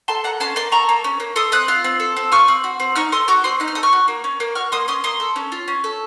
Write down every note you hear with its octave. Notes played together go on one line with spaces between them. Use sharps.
A4 A5 C6
A#3 F#5 A#5
C#4 A5 C6
A#3 A5 C6
A4 A#5 C#6
A#3
C#4
A#3
A4 C6 D#6
C4 D#6 F#6
F4
C4
A4
C4
F4 C#6 F6
C4
F#4
C4
D#4 C#6 F6
A4 C6 D#6
F#4 A#5 C#6
C4 C6 D#6
D#4 F#6
F6
A4 D#6
C#6 F6
F#4
A#3
C#4
A#3
F#4 C#6 F6
A#3 C6 D#6
C#4 C6 D#6
A#3 C6 D#6
A4
C#4
F4
C#4
A4